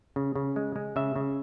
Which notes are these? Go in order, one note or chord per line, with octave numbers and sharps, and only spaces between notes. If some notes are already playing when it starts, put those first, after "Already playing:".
C#3
C#3
G#3
G#3
C#3 E5
C#3